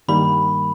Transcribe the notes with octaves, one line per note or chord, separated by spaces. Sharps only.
G2 D#3 G3 A#3 B5